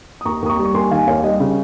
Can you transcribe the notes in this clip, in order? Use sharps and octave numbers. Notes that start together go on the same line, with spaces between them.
D#6
D#2 A#5 C#6
D#2 D#6
A#5 C#6
G3
C#6
D#2 G#5 C6
D#3 F5 G#5
D#2 C#5 F5
G3 D#5
C#3